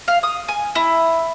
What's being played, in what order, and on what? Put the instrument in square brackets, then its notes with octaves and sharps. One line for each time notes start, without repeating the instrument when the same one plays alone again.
[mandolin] F5
D#6
G#5
E4